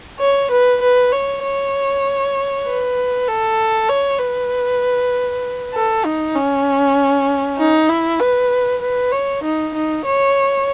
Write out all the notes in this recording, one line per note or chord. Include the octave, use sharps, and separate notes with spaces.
C#5
B4
B4
C#5
C#5
B4
A4
C#5
B4
A4
D#4
C#4
D#4
E4
B4
B4
C#5
D#4
D#4
C#5